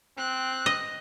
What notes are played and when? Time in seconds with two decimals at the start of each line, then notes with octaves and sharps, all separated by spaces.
0.17 C4 F#6
0.66 D#5